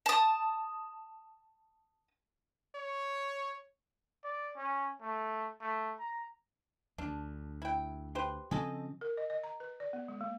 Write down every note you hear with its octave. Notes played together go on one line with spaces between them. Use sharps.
A5 D#6
C#5
D5
C#4
A3
A3
A#5
D2 D4
E4 G5
G4 B4 C5
C#3 F3 C4 G#4 A4 D#5
A#4
D#5
D#5
A#5
B4
D5
B3
G#3
A#3